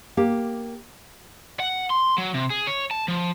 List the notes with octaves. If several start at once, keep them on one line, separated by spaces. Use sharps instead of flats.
A#3 G4
F#5
C6
F#3
C3
G#4
C#5
A5
F3